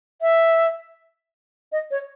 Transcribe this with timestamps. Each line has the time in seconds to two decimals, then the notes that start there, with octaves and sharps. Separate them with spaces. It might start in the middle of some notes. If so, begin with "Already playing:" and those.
0.22 E5
1.72 D#5
1.91 C#5